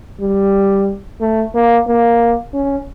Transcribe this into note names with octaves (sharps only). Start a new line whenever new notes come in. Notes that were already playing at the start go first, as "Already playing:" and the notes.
G3
A3
A#3
A#3
C#4